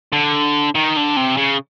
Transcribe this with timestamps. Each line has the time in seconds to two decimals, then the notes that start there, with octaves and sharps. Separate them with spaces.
0.13 D3
0.75 D#3
0.96 D3
1.17 C3
1.37 C#3